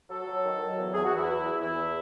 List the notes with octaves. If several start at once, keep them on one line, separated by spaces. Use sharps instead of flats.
F#3 A4
F#3
D#3
F#3
E2
E2 G#4
F#4
E2
E4
E3
E3
E2 E4
E2